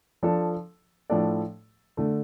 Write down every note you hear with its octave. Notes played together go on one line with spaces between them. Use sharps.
F3 D4 A4
A2 F3 D4 A4 D5
D3 A3